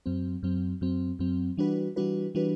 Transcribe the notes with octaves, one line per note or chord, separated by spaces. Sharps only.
F#2 F#3 C4
F#2 F#3 C4
F#2 F#3 C4
F#2 F#3 C4
E3 G3 D4 F#4 B4
E3 G3 D4 F#4 B4
E3 G3 D4 F#4 B4